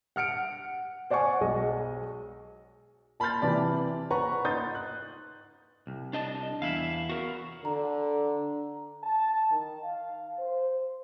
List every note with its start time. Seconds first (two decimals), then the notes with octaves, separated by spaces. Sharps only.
0.16 F#5 F6 C#7 D7
1.10 C5 D5 F#5 G#5 C#6
1.41 B1 G#3 D#5
3.20 A5 B5 C6 F6 G6 A6
3.41 C3 E3 D5 A5
4.11 B4 F#5 A#5 C#6
4.45 D#4 C6 D#6 G6 A6
4.75 F#6
5.87 C2
6.13 D4 D#5 A5
6.62 E2 E4 E5 F5
7.09 F#4 A#4
7.65 D3 A#5
9.04 A5
9.51 D#3
9.83 F5
10.39 C5